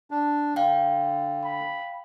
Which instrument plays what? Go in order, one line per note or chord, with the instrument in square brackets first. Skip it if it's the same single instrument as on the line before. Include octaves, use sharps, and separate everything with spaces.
[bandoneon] D4
[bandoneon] D3 [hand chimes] F5 G5
[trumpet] B5